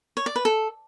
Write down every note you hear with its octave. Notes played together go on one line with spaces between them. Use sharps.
C#5
D5
B4
A4